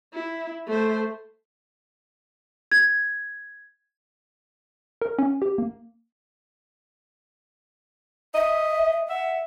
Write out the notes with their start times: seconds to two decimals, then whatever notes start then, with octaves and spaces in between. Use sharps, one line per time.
0.13 E4
0.66 A3 C5
2.72 G#6
5.02 A#4
5.19 C#4
5.42 G4
5.58 A#3
8.34 D#5 E5
9.09 E5 F#5